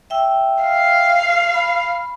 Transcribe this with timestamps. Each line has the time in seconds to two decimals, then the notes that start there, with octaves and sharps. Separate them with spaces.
0.10 E5 G5 E6
0.63 F5
1.54 B5